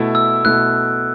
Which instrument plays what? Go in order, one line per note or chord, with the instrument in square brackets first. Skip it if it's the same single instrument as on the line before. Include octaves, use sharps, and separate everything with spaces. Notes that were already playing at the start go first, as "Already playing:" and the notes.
Already playing: [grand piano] B2 A3 E4
[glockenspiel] E6
[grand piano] B2 A3 E4 [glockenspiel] F#6